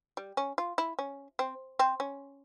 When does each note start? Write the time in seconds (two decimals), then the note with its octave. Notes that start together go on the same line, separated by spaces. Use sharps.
0.17 G3
0.37 C#4
0.58 F4
0.78 E4
0.99 C#4
1.39 C4
1.79 C4
2.00 C#4